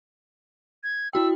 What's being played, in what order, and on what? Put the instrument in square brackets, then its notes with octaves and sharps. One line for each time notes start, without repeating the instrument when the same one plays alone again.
[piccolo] G#6
[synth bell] E4 F#4 G5 [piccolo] E6